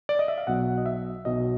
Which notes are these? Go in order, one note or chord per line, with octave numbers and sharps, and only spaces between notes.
D5
D#5
E5
F5
B1 B2 F#3 F#5
D#5
E5
B1 B2 F#3 D#5